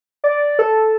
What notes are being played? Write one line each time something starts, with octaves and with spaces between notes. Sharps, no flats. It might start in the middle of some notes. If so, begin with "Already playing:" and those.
D5
A4